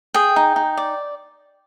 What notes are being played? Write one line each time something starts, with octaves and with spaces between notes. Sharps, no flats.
G#4 G5
D#4
D#4
D5